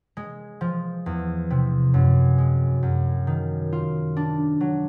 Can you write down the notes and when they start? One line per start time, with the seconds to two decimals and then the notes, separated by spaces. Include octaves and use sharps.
0.17 G#3
0.61 F3
1.06 E2
1.50 C3
1.94 F#2
2.38 G#3
2.83 F#2
3.27 D#3
3.73 F4
4.17 D4
4.61 F#3